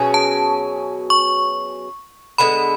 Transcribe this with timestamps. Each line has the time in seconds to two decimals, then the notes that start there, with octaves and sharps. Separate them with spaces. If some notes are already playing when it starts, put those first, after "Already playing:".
Already playing: B2 F#3 C#4 G#4
0.14 A5
1.10 C#6
2.38 D3 G#3 B3 B5